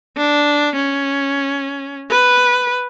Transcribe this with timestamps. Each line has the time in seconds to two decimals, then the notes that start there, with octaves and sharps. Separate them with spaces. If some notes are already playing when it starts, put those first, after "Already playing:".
0.17 D4
0.75 C#4
2.10 B4